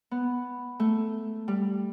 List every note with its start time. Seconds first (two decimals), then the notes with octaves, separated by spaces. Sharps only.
0.11 B3
0.80 A3
1.48 G3